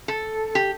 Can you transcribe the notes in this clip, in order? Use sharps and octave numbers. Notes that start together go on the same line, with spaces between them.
A4
G4